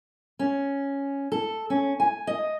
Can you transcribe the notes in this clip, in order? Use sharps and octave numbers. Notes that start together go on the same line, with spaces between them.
C#4
A4
C#4
G#5
D#5